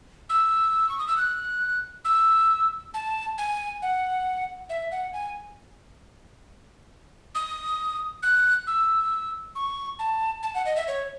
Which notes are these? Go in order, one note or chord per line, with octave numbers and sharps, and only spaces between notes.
E6
C#6
D#6
E6
F#6
E6
A5
G#5
F#5
E5
F#5
G#5
D#6
F#6
E6
C#6
A5
A5
F#5
D#5
E5
C#5